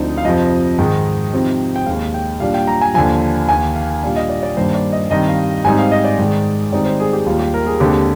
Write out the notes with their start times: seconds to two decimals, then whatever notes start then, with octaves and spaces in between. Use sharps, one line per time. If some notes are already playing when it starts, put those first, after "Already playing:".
Already playing: D2 D3 F3 C4 D#4 D5
0.18 F5
0.25 F2 C3 F3 D#5
0.78 G#2 D#3 G#3
1.34 C3 F3 C4 D#4
1.76 G5
1.86 D#2 D#3 G#3 F5
2.14 G5
2.40 A#2 G3 D4 F5
2.54 G5
2.67 A#5
2.82 G#5
2.94 D#2 D3 F3 G#5
3.49 D#2 D#3 A#3 G#5
3.76 F5
4.03 A#2 G3 A#3 D4 F5
4.16 D#5
4.29 D5
4.43 D5
4.57 G2 D#3 A#3 D4 C5
4.75 D5
4.92 D#5
5.10 G2 D#3 G3 C4 D#4 D#5
5.28 F5
5.64 G#2 G3 C4 D#4 G#5
5.79 F5
5.92 D#5
6.04 D5
6.18 G#2 D#3 G#3
6.72 G#2 D#3 G3 C4 D#4 D5
6.85 C5
7.00 G#4
7.13 G4
7.26 D#2 D#3 G3 F4
7.40 G4
7.54 A#4
7.66 G#4
7.80 D#2 D3 G#3 C4 G4